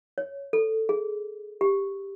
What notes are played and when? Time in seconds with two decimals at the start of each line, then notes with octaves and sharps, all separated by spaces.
0.18 C#5
0.53 A4
0.89 G#4
1.61 G4